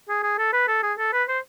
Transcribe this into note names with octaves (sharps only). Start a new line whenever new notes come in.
G#4
G#4
A4
B4
A4
G#4
A4
B4
C5